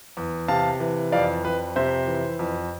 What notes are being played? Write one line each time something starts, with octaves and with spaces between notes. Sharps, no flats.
E2
C3 F5 A5
E3
F2 D5 F5
F2 B4
C3 C5 E5
E3
F2